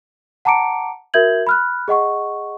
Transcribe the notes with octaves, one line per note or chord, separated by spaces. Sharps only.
F#5 A5 A#5 D6 C#7 D7
F#4 A#4 E5 G6 G#6 F#7
B5 F6 F#6
G#4 D#5 F#5 C#6